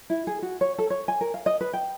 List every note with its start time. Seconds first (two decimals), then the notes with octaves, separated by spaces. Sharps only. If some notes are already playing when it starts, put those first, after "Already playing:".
0.10 E4
0.27 G#4
0.42 F#4
0.61 C#5
0.78 A4
0.90 C#5
1.08 G#5
1.21 A#4
1.34 F5
1.46 D#5
1.61 B4
1.73 G5